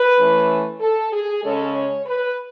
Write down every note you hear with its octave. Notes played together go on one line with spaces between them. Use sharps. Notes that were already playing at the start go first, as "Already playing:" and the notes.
Already playing: B4
E3 A3 C#4
A4
G#4
C#3 G#3 C#4 A4
C#5
B4